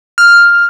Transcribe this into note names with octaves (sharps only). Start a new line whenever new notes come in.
F6